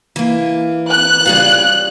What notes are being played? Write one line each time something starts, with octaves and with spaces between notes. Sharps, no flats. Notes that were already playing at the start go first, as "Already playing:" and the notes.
E3 A#3
F#6
C#3 G3 F4